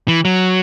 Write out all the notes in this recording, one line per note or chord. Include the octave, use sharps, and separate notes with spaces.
E3
F#3